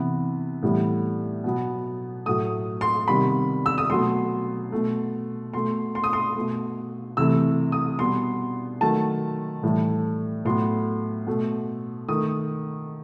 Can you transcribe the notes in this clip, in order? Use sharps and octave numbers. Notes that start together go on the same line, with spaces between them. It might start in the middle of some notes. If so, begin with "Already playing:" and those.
Already playing: C3 E3 B3
A2 E3 G3 B3
B2 F#3 B3
A2 F#3 A3 D#6
C6
C3 D#3 G3 B3 B5
E6
D#6
B2 F#3 A3 C6
B2 A3
B2 A3 C6
C6
D#6
C6
B2 A3
C3 E3 A3 E6
D#6
B2 G3 B3 C6
D#3 F#3 A3 A5
A2 E3 G3
A2 F#3 B3 C6
B2 A3
D#3 A3 D#6